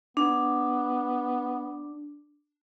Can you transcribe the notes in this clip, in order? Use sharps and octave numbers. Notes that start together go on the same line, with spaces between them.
B3 D4